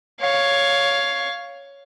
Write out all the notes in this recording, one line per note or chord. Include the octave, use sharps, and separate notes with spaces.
C#5 F5